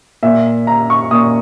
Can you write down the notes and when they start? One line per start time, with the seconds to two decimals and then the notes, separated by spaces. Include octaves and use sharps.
0.23 A#2 E5
0.67 A#5
0.90 C#6
1.11 A#2 D#6